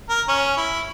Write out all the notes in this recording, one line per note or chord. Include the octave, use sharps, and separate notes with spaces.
A#4
C#4
E4